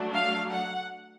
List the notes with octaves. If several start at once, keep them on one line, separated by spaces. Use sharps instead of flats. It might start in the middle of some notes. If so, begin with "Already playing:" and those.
Already playing: F#3 A3 D4
F5
F#5